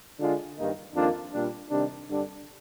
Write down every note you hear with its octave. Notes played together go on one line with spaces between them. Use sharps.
D3 G#3 D4 F4
G2 D#3 A#3 D#4
F2 D#3 A#3 D4 F4
A#2 G3 D4
C3 D#3 G3 D4
G2 D3 G3 D4